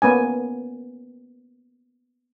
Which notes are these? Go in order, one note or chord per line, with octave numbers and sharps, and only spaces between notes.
A#3 B3 C#4 G#5